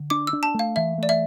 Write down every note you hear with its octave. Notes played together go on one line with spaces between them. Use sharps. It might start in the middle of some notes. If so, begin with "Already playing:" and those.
Already playing: D3
D4 D6
E6
D4
A5
A3 F5
E3 E5
A3 D5
E5